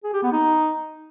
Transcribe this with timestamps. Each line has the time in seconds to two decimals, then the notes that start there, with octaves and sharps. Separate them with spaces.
0.04 G#4
0.13 G4
0.23 B3
0.33 D#4